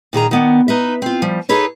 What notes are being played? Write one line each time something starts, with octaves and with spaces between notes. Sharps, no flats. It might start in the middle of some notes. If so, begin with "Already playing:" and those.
A#2 D#3 G#4 A#5
D#3 B3 D4
D#4 B4 E5
C4 F4
F3 G3
D#4 G#4 A4 B4 C#5 D#5